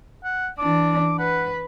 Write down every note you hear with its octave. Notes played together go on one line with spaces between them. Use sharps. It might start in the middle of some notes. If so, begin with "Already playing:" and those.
F#5
E3 D4 D6
B4 F#5